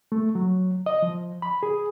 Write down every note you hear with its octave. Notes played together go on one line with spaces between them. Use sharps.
A3
F#3
D#5
F3
B5
G#4